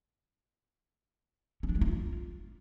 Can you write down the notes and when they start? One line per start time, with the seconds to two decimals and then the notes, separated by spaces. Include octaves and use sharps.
1.63 C#4
1.69 D4
1.75 G#3
1.81 D#4
1.87 F4